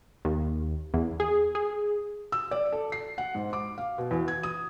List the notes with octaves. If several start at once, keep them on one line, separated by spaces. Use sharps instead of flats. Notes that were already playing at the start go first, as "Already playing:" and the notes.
D#2
E2
G#4
G#4
E6
D5
A4
C7
F#5
G#2
D6
F5
B2
E2
G#6
D#6